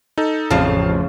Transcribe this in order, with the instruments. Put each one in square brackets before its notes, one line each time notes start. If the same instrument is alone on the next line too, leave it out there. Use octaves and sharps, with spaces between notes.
[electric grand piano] D#4 A4
[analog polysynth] A1 F2 [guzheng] C#3 F3 [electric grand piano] F5 A5